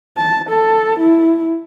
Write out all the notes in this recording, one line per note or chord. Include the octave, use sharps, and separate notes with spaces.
A5
A4
E4